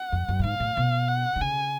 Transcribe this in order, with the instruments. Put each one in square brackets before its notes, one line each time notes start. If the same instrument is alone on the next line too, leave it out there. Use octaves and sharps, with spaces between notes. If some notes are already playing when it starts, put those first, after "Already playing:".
Already playing: [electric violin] F#5
[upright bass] F2
F#2
A2
[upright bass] G#2 [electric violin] F5
[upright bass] A2
B2
[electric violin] F#5
[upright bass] D3
[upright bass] C#3 [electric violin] G#5